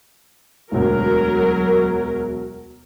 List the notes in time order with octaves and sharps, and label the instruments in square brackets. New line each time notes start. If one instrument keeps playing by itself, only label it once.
[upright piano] E1 D2 [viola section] F#3 A#4